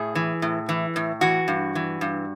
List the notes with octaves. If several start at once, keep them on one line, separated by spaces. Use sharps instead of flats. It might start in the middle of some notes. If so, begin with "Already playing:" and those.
Already playing: A2 G#4
E3
A2
E3
A2
E3 F#4
G2
E3
G2